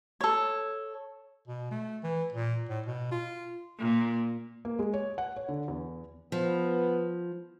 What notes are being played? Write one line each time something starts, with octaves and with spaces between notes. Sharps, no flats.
A4 C#5
B2
A3
E3
A#2
A2
B2
F4
A#2
A#3
G#3
C#5
F#5
C#5
D3
E2
F3 B3